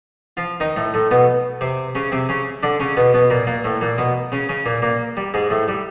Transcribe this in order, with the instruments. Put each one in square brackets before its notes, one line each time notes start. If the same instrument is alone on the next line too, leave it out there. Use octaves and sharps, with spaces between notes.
[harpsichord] F3 F4
D#3 D#4
A2 A3
A2 A3
B2 B3
C3 C4
C#3 C#4
C3 C4
C#3 C#4
D3 D4
C#3 C#4
B2 B3
B2 B3
A#2 A#3
A#2 A#3
A2 A3
A#2 A#3
B2 B3
C#3 C#4
C#3 C#4
A#2 A#3
A#2 A#3
G3
G#2 G#3
A2 A3
G3